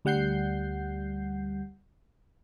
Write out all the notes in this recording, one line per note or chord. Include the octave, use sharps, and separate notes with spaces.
D2 G3 F#5 G6 C7